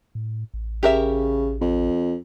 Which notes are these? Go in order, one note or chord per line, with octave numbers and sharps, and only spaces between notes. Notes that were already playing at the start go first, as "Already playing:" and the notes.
A2
A1
C#3 G4 A#4 E5
F2